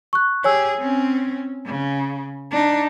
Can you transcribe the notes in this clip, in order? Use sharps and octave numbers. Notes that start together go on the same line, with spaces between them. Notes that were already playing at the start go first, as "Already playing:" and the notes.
C#6 F#6
G4 G#4 C#5 G#5 E6
C4 C#4
C#3
D4 D#4